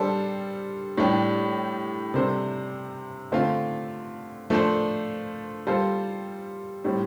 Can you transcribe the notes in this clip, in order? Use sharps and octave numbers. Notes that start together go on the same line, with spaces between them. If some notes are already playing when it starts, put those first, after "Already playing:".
Already playing: G3 D4 A4 C5
A2 G3 D4 G4
C3 G3 D4 A4 C5
D3 A3 C4 F4
F3 A3 D4 A4 C5
G3 F4 A4 C5
A2 G3 C4